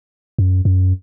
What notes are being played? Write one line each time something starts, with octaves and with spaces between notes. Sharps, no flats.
F#2
F#2